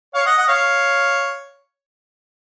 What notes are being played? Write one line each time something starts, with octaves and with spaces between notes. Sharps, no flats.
C#5 F5
D#5 F#5
D#5 F#5
C#5 F5